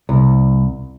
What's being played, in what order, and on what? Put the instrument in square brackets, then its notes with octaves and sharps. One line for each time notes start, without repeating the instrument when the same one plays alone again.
[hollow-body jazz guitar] C2